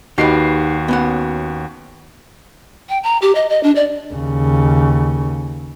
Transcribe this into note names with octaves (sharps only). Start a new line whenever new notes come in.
D#2 D#4 F#4 G4 B4 C7
B3 C#4 F#5
G5
A#5
G4
D#5
D#5
D4
D5
D#2 C#3